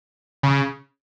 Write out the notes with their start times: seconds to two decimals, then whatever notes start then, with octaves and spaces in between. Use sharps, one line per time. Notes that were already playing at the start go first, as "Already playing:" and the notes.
0.43 C#3